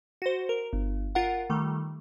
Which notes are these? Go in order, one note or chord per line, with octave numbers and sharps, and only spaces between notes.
F#4 C5
A#4
G1
F4 A#4 F#5
D#3 G3 A3